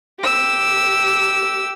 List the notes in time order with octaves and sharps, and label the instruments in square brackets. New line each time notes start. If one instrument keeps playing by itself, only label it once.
[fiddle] G4 E6